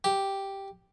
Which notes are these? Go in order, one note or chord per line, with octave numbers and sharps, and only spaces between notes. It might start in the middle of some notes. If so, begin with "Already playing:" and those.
G4